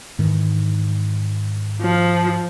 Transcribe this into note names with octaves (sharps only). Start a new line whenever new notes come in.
G#2 D#3 E3
F3